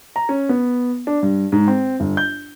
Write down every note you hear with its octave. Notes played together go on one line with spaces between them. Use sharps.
A#5
C#4
B3
D4
G2
G#2
C4
G1
G6